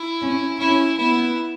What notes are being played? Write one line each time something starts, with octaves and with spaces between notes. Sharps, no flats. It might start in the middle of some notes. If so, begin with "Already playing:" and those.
Already playing: E4
C#4
C#4 E4
B3 E4